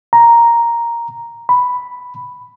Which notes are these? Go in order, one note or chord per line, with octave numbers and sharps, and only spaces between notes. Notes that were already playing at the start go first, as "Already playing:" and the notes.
A#5
B5